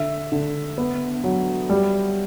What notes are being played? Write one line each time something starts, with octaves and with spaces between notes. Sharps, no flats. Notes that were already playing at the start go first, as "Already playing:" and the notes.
Already playing: D3 E5
D3
B3
F#3
G3